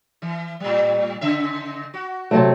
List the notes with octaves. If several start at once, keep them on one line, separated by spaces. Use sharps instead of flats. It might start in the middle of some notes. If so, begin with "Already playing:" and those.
E3
A2 G3
C#3 E5
F#4
C3 F#3 A3